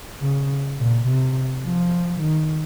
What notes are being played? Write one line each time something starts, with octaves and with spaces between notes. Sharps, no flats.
C#3
A#2
C3
F3
D#3